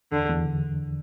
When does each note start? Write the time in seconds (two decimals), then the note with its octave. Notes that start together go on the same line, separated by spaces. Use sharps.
0.12 E2 D3
0.29 E2
0.45 D3